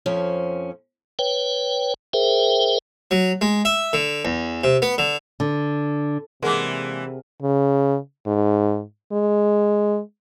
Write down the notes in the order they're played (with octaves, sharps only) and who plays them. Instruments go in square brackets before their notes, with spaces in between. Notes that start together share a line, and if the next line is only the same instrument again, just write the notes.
[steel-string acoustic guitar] F2 F3 C#4
[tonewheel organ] B4 C#5 G5
G#4 A#4 C5 E5 G5
[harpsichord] F#3
G#3
E5
D3
E2
C3
B3
D3
[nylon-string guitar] D3
[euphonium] C3 [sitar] E3 D4 [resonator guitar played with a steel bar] G#3 A#3 [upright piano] G#4 A#4 F#5
[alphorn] C#3
G#2
G#3